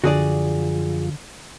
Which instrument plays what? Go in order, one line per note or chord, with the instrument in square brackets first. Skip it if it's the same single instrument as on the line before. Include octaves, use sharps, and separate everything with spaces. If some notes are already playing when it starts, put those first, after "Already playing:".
[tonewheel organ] F#2 F3 F4 [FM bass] D3 [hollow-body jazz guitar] F#4 G#4 D5